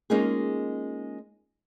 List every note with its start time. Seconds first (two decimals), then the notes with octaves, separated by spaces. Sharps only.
0.10 G#3 A#3 C#4 D#4 F4 G#4